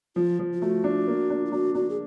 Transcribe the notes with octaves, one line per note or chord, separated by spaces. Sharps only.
F3 F4
F3
F4
A3 F#4
D4
A#3
D4
F4
D4 F#4
D4 F#4
G#4